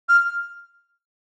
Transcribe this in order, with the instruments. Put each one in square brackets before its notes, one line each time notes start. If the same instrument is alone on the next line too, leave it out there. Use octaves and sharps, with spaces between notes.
[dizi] F6